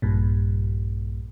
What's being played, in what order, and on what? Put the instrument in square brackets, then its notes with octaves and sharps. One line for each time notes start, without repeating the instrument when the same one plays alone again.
[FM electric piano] A#1 G2 A#2